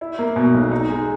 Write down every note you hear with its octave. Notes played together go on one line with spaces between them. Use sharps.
E4
A#3
B2
B1
D#4
G#3